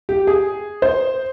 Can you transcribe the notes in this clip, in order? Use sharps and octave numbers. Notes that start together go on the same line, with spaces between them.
G4
G#4
C5